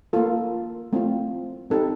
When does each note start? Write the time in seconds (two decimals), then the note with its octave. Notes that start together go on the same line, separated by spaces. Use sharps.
0.13 A#3 F4 A4
0.93 A3 C4 F4
1.70 C4 D#4 G4 A4